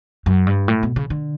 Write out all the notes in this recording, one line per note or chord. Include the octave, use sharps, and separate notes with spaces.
F#2
G2
A2
B2
C#3
D3